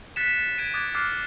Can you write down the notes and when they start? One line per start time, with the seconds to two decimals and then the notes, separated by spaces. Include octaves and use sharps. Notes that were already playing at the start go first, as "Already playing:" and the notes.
0.16 F#6 A6 B6 C#7 E7
0.58 G#6 D7 D#7
0.74 D6 D#6 F#6 G#6 A6 D7
0.95 D6 D#6 F6 F#6 A6 C7
1.12 A6